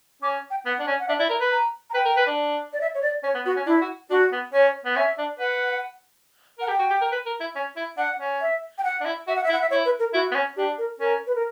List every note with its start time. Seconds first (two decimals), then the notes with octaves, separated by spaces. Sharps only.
0.22 C#4 D6
0.51 G5
0.65 B3 F#5
0.79 D4
0.87 C#4
1.00 F#5
1.08 D4 E5
1.19 E4 D5
1.30 A#4
1.40 B4 B5
1.51 A#5
1.90 A#5
1.94 B4 G5
2.05 A#4
2.17 B4
2.27 D4
2.73 D5
2.81 E5
2.95 C#5
3.02 D5
3.23 C#4 C#5
3.34 B3
3.45 B3 F#4
3.56 C#4
3.66 D4 E4
3.81 F#4
4.10 D4 F#4
4.32 B3
4.53 C#4 C#5
4.85 B3
4.96 C#4 E5
5.18 D4
5.39 B4 F#5
6.59 A#4 F#5
6.68 G4 G5
6.79 F#4
6.90 G4
7.02 A#4
7.12 B4
7.26 A#4
7.40 E4
7.55 C#4
7.77 E4
7.97 D4 F#5
8.20 C#4
8.41 E5
8.78 G5
8.84 F#5
9.01 D4
9.05 E4
9.27 F#4 E5
9.36 F#5
9.44 E5
9.49 E4
9.52 F#5
9.62 E5
9.71 E4 C#5
9.85 B4
9.99 A#4
10.14 E4 F#4
10.31 B3
10.35 C#4
10.57 D4 G4
10.78 A#4
11.00 C#4 A#4
11.27 B4
11.35 A#4